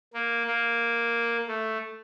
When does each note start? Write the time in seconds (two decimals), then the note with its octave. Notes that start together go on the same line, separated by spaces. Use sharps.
0.14 A#3
0.47 A#3
1.48 A3